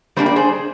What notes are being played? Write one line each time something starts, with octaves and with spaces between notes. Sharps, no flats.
G3 A#3 D4 C5
D5
G#4 C5